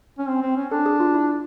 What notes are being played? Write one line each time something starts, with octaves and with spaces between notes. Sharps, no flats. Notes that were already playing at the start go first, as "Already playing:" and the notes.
C#4
C4
C4
C#4
D4 A4
G#4
F4
E4